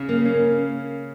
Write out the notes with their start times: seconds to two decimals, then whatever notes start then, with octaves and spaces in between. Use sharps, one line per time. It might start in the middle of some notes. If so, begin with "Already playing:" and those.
Already playing: C#3
0.09 A#3
0.25 C#4